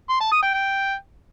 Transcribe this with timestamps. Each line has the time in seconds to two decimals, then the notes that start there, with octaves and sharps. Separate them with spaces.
0.09 C6
0.21 A5
0.32 D#6
0.43 G5
0.54 G5